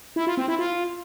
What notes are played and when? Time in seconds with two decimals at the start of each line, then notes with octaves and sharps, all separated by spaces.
0.16 E4
0.27 F4
0.37 C4
0.48 E4
0.59 F4